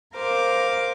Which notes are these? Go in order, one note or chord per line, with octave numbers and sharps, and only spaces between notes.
A#4 C5 F5 D6